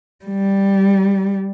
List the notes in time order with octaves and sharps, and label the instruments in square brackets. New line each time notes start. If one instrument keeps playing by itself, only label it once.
[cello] G3